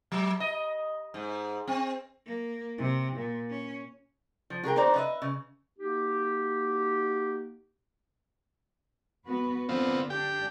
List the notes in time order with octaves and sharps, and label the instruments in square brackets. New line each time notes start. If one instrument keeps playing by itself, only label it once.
[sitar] F#3
D#5
G#2
C4
[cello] A#3
C3
A#2
C#4
[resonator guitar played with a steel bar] F3
F#4 G#4 A#4 G5
D#3 D#4 F#4 C5 D5 A#5
B4 D#5 E5
C#3
[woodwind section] A#3 D#4 F#4 G4
[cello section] B3 F#4 B4
[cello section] D3 [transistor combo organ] B3 C4 F4
[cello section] D4 [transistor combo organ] G4 G5